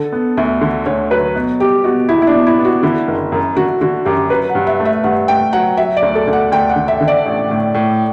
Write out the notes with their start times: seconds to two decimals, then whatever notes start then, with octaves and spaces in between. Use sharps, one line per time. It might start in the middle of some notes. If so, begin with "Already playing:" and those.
Already playing: D3 A4
0.12 B3
0.37 D2 E5
0.61 D3
0.86 D2 C#5
1.11 F#3 B4
1.36 B2
1.60 G3 G4
1.84 B2 F#4
2.09 E2 E4
2.22 E4
2.27 D4
2.33 B2
2.46 E4
2.58 B3
2.65 F#4
2.83 D3 E4
3.08 F#1
3.32 F#2
3.57 D3 F#4
3.81 D3 F#4
4.05 F#2 G4
4.30 F#3 B4
4.49 F#5
4.55 G2
4.67 E5
4.79 A3
4.85 E5
5.04 G2 F#5
5.28 A3 G5
5.53 F#3 F#5
5.77 F#3 E5
5.97 D5
6.02 D2
6.15 A4
6.27 D2
6.33 F#5
6.52 D2 G5
6.70 F#5
6.76 D3
6.88 E5
7.01 D3
7.08 D5
7.26 A1
7.50 A2
7.74 A2